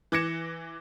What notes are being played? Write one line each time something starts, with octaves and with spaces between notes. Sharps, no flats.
E3 D6 G#6 A#6 C#7 E7